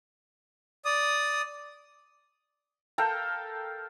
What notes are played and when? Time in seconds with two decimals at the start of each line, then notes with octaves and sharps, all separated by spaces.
0.85 D5 D#6
2.98 A4 A#4 F5 G5